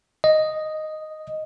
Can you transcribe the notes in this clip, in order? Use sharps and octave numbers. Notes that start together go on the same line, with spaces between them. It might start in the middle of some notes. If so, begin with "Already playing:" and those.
D#5